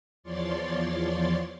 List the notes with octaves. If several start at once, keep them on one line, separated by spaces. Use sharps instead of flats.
E2 F3 C#5 D5 C6 A6